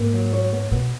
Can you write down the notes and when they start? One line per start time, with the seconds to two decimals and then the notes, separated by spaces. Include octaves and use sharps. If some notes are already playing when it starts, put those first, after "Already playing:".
Already playing: G#2 A#3
0.13 F#3
0.33 C#5
0.53 B3
0.72 B2 B3